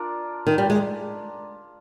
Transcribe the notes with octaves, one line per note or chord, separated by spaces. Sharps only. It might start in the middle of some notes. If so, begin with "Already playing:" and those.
Already playing: D4 F4 A#4 D5
D#3
G3
G#3